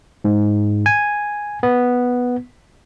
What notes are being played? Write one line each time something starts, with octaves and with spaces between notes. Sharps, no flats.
G#2
G#5
B3